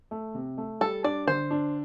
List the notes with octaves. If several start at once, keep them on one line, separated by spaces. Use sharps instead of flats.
A3
C3
A3
G3 A4
D4 D5
D3 C5
D4